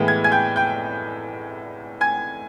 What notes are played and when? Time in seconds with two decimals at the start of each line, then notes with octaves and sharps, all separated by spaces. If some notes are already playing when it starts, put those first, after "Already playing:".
Already playing: A2 E3 G#3 B3 G5
0.08 G#6
0.24 G#5 G#6
0.32 G5 G6
0.56 G5 G6
2.01 G#5 G#6